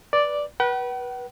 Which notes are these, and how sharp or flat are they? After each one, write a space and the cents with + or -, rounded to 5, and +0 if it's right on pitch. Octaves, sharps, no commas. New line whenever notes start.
B4 -10 D5 +0
B4 -25 F#5 +45